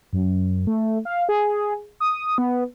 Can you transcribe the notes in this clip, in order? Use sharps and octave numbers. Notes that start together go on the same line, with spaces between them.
F#2
A3
F5
G#4
D#6
B3